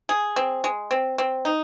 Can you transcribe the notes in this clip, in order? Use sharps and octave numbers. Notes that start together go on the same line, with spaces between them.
G#4
C4
G#3
C4
C4
D#4